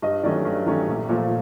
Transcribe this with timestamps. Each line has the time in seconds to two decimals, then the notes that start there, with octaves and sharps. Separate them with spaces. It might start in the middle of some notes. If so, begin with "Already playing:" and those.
0.02 G2 D#5
0.23 D#3 F#3 A3 C#4 D5
0.45 G2
0.66 D#3 F#3 A3 C#4
0.89 A#1
1.09 A#2 F3 A3